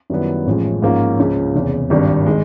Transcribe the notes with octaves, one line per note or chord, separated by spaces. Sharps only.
F#2 D#3 G3 B3 E4
A1 A2 F3 G#3 C#4
G#2 F3 A#3 C#4 F4
C#2 C#3 F3
F1 E2 C#3
G#1 G2 D#3 G3
D#3 G#3